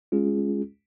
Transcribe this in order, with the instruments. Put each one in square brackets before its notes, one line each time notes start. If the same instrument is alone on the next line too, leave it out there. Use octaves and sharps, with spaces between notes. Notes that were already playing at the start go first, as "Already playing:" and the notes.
[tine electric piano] G#3 C#4 F4 G#4